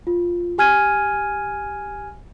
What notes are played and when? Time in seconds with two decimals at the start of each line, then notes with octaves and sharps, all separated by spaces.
0.07 F4
0.58 G4 G#5 F6 G#6 D#7